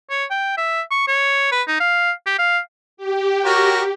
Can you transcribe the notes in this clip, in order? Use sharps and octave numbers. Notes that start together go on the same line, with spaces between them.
C#5
G5
E5
C#6
C#5
B4
D#4
F5
G4
F5
G4
F#4 A#4 C#5